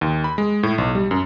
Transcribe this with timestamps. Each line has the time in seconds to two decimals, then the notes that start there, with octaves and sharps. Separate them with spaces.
0.01 D#2
0.24 B5
0.38 G#3
0.63 A2
0.78 B1
0.95 G3
1.11 F#2